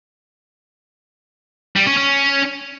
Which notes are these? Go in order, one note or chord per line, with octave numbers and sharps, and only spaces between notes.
G3
C#4
C#4